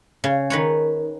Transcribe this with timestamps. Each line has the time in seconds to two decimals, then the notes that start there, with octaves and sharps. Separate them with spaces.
0.24 C#3
0.50 D#3 B4 C#5